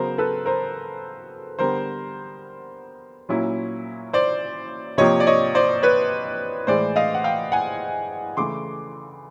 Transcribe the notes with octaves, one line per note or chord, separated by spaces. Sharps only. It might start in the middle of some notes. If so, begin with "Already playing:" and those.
Already playing: C#3 F#3 B3 A#4 C5
A4 B4
A#4 C5
D3 G3 B3 A#4 C5
A#2 F#3 A#3 C#4 E4
C5 D5
C3 F3 A#3 C#5 D#5
D5
C#5 D#5
C5 D5
B4 C#5
A2 E3 G#3 C5 D5
D#5 F5
F#5
F5 G5
F#5 G#5
C#3 E3 A3 C6 D6